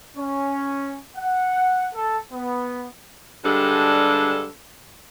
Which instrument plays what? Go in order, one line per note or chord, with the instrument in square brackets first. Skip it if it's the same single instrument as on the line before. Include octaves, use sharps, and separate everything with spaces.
[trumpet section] C#4
F#5
A4
B3
[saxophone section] G2 D3 G3 G#3 D4 A4